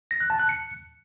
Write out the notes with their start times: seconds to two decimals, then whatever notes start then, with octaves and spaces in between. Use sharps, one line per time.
0.11 A#6
0.20 F#6
0.30 A5
0.39 F#6
0.49 C#7